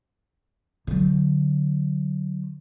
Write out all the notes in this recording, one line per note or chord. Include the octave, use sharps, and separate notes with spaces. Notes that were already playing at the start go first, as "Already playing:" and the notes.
D3 F#3